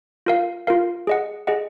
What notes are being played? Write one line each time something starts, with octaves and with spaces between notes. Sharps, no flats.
F4 A#4 F5
F4 A#4 F5
G#4 D#5 F#5
G#4 D#5 F#5